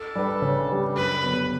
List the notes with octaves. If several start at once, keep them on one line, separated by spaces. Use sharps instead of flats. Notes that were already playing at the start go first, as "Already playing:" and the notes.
Already playing: A4
G3 D4 G4 B4
C#3
G3 D4 G4 B4
F#2 B4
D3 F#3 B3